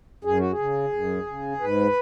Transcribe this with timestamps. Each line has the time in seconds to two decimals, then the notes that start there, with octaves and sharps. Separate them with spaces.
0.24 F#2 G#4
0.38 F#4
0.51 G#4
0.59 C#3
0.93 F#2
1.27 C#3
1.60 G#2 B4